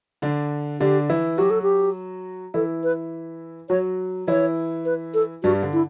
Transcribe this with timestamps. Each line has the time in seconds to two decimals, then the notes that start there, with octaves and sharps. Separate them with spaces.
0.22 D3 D4
0.80 D3 D4 G4
1.10 E3 E4
1.38 F#3 F#4 G4
1.50 A4
1.62 G4
2.54 E3 E4 A4
2.84 B4
3.69 F#3 F#4 C#5
4.27 E3 E4 C#5
4.85 B4
5.14 A4
5.43 G2 G3 F#4
5.63 D3
5.73 E4